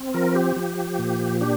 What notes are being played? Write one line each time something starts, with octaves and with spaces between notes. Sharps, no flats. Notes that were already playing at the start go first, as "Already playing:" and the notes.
Already playing: C4
F3 A#4
G4
F3
A#2
D4 G4